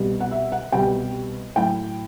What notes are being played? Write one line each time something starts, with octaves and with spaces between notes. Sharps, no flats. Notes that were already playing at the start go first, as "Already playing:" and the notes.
Already playing: C2 B2 G3
F#5
E5
F#5
C2 B2 G3 G5
A2 F#3 A3 G5